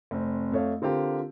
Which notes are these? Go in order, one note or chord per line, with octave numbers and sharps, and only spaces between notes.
F1 C4
F2 A3 C#5 F5
D3 C4 F4 G4 A#4